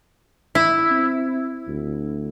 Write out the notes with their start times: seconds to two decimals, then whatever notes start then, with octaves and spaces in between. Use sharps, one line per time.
0.55 E4
0.91 C4
1.68 D2